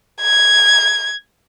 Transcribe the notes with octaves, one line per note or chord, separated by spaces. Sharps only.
G#6